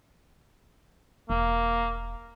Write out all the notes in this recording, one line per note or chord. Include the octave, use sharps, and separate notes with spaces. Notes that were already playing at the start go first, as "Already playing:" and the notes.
E1 A#3